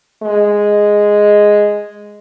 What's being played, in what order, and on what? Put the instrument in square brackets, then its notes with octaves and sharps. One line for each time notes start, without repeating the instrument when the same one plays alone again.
[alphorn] G#3